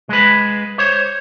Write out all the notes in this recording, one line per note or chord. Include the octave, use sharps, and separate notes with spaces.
G#3 B4
C5 C#5